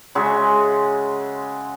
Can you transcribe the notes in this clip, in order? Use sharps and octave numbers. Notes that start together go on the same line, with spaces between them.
C#3 G#3 F#4 E5